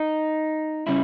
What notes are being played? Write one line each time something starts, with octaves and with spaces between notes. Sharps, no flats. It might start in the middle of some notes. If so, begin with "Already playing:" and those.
Already playing: D#4
C#3 G3 C#4 E4